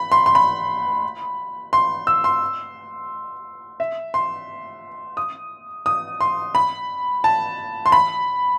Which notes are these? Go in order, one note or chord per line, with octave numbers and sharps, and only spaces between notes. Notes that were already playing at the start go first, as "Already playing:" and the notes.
Already playing: B5
C6
C6
B5
C6
E6
C6
E5
C6
D#6
D#6
C6
B5
A5
C6
B5